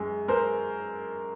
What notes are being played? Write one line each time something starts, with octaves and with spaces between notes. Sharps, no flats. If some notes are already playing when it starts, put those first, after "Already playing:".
Already playing: F#2 G#3
G#3 A#4 C5